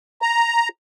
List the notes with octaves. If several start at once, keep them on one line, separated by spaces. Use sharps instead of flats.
A#5